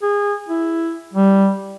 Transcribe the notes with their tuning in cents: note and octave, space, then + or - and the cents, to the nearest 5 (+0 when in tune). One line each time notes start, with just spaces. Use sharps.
G#4 -25
E4 +5
G3 -5